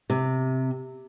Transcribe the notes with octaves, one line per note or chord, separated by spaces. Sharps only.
C3